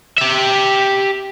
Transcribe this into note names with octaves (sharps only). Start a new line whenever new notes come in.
G4 E5